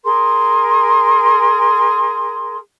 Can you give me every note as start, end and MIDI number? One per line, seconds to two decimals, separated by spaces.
0.03 2.57 68
0.03 2.57 70
0.03 2.57 84